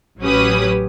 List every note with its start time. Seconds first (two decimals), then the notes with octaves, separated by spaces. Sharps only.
0.20 A1 F#3 C#4 G4 B4 D#6